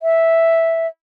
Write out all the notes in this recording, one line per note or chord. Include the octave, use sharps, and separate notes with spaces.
E5